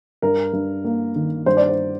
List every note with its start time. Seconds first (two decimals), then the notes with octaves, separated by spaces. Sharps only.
0.22 G2 A#4
0.53 G2
0.84 A#3
1.16 D#3
1.46 G2 C5
1.57 D5
1.68 C5